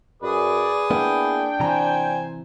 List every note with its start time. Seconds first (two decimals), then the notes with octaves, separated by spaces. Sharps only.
0.22 F#2 G#4 B4 D5 D#6
0.91 A#3 B3 D4 E4 G5
1.60 C3 E3 C5 G#5 A#5